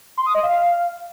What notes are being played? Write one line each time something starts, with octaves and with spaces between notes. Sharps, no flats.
C6
D#6
D#5
F5